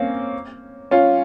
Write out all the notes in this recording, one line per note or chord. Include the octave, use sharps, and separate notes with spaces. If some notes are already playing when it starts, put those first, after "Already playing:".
Already playing: A#3 C4 C#4
C#4 F4